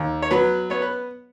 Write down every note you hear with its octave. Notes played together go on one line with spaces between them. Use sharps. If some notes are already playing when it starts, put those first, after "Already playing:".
Already playing: D#2
C#5
F#3 B3 B4
B3 C#5
B4